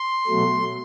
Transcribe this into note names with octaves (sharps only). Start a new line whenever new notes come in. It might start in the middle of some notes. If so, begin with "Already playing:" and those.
Already playing: C6
B2 F#3 A3